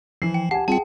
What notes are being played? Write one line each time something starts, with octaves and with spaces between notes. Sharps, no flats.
E3 F3 C7
G5
G4 F#5 G#5 A5
G3 C4 F4 G#4 G5 A5